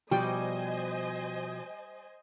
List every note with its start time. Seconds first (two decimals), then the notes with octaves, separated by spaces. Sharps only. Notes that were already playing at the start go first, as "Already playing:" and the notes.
0.11 B2 F3 G3 C5 D#5 G5 G#5